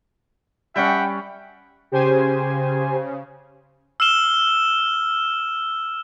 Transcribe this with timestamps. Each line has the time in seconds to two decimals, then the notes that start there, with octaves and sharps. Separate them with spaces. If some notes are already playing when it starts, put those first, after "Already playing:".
0.76 G3 C#4 E5 F#5 G5
1.92 C#3 G4 C5 G#5
4.00 E6 F6 E7 G7